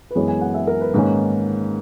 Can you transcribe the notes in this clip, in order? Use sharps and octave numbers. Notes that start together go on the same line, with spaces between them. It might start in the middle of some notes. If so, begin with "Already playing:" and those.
B4
F#2 E3 G#3 B3 C#5
G#5
F#5
E5
A#4
B4
G#2 D#3 A#3 C#4